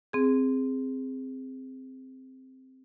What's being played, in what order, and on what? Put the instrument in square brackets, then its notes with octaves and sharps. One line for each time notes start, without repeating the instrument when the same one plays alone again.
[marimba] C4 G#4